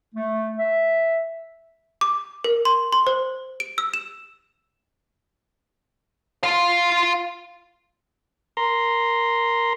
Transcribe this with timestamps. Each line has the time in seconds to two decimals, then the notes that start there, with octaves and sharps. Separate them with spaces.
0.15 A3
0.58 E5
2.01 D6
2.44 A#4
2.65 C6
2.93 C6
3.07 C5
3.60 D7
3.78 E6
3.94 E7
6.44 F4 F5
8.57 A#4 A#5 C6